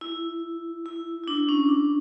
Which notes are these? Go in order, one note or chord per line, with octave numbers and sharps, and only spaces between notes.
E4
E4
E4
D4
C#4
D4